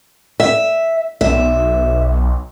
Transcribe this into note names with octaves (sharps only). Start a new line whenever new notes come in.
E5
B1 E5